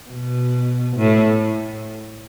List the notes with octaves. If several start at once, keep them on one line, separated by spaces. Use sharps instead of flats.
B2
A2